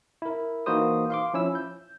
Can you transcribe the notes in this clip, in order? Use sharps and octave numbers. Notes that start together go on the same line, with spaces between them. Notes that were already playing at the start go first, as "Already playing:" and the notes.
E4 A#4
E3 A#3 D#4 F#4 C5 D#6
F5 C6 D6
F3 C#4 E4 E6
G6